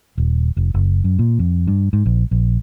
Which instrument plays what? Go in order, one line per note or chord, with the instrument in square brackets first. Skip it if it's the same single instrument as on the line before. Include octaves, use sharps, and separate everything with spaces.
[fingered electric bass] D#1
F1
F#1
F#2
A#2
F2
G2
G#2
A#1
A#1